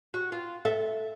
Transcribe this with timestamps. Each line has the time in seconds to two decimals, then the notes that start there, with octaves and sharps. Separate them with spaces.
0.14 F#4
0.32 F4
0.65 A4 E5